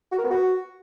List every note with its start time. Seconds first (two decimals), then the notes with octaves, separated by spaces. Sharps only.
0.12 F#4
0.18 A#4
0.24 B3
0.30 F#4